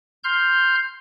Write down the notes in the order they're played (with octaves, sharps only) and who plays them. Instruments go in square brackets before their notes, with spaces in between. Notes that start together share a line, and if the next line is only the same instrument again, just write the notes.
[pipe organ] C6 F6 G6